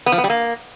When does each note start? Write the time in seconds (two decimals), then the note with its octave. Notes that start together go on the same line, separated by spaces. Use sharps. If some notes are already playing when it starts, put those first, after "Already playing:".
0.06 B3
0.12 F3
0.18 B3
0.24 G3
0.30 A#3